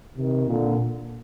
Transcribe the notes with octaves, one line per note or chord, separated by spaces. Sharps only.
C3 D#3
A#2 D3